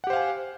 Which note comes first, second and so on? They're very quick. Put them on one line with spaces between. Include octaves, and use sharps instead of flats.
F#5 G4 C5 F5 G#5